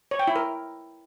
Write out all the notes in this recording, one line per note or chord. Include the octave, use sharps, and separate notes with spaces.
C#5
G5
E4
A#4